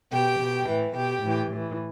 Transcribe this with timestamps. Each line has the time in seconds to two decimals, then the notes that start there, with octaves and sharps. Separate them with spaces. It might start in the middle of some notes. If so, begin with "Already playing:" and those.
0.12 B2 G4 G5
0.40 B2
0.68 A2 E3
0.96 B2 G4 G5
1.24 A2 E3
1.52 A2 E3